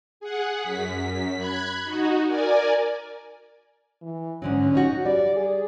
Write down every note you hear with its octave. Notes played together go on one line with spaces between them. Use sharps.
G#4 F#5
F#2 B6
B5 F#6 G#6
D#4 F#4
A#4 D5 G#5
E3
G#2 D3 F#3 C#4
D#4 F#4
G3 D5
G#4